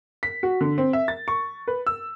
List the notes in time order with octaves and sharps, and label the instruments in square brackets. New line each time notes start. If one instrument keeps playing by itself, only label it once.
[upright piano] B6
F#4
D3
C4
E5
A6
C#6
B4
E6